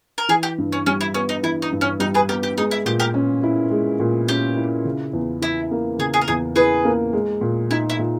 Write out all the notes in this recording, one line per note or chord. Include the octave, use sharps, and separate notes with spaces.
A#4
E3 G#4
G4
G2
C#4
G3 C#4
E4
B3 C#4
D#4
E3 E4
D#4
G2
C#4
G3 D#4
G#4 B4
B3 G4 A#4
G4
G#3 D#4
E4
A#2 G4
G4 A#4
C#4
E4
G#3
A#2
C#4 G4
E4
C#3
E2
E3 E4
A#3
C#3 G#4
G#4
A#4
E2 G#4
E3 G#4 B4
A#3
G#3
A#2
D#4 E4
E4
A#2